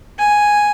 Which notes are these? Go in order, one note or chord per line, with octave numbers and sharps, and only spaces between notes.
G#5